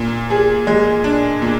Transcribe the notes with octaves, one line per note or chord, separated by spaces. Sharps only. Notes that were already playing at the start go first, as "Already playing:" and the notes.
Already playing: A#2
G#4
G#3
D4
A#2